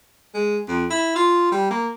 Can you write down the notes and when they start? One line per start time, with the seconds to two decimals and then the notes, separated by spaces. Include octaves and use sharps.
0.34 G#3
0.68 F2
0.90 E4
1.15 F4
1.52 G3
1.70 A#3